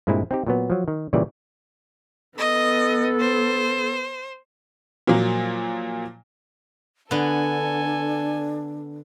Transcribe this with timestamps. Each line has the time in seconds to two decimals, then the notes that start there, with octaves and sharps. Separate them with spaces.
0.07 G2 A#2 G#3 C4 E4
0.31 C4 D#4 G4
0.46 A#2 F#3 B3
0.70 F3 F#3
0.88 D#3
1.13 A#2 C#3 E3 G3 D5
2.38 B3 A4 D#5
3.20 C5
5.07 A#2 F3 F#3 A#3
7.11 D3 B3 D4 A4 G#5